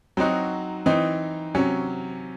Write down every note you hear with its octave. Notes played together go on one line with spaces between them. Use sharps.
F#3 C4 D#4 F#4
E3 C4 D#4
C3 F#3 C#4